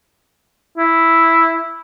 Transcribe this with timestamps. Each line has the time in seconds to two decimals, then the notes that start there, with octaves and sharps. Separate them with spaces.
0.78 E4